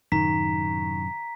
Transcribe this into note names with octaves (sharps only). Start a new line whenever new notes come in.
F#2 A2 C3 D#3 A#5 B6